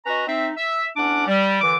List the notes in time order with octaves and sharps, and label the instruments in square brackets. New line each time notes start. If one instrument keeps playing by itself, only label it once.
[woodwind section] C#4 F#4 B4 D#5 A#5
C4 D#4 E5
E5
E2 C#4 D4 F#5 D6
G3
F#2 D3 E3 D6